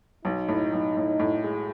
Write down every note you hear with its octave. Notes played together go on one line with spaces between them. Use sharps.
B1 D#4
A2
B1
A2
A2
G#3